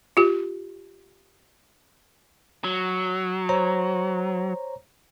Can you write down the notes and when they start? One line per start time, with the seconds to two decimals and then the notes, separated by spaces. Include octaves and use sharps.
0.17 F4 G4
2.64 F#3
3.49 C5 C#5 A#5